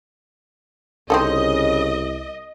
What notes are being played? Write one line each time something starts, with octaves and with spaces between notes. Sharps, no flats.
C2 C#3 C4 D#4 A4 D#5